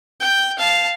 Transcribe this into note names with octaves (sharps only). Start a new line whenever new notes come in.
G5
F5 A5